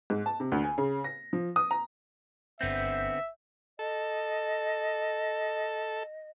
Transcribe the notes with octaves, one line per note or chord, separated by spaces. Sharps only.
G#2
A5
C3
D2
G#5
C#3
A#6
F3
D#6
A#5
G1 D3 B3 C4 E5 G6
A4 D#5